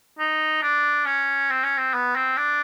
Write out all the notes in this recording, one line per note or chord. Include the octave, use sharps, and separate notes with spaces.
D#4
D4
C#4
C4
C#4
C4
B3
C4
D4